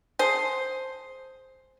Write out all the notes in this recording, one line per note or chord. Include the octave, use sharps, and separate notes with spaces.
G#4 C5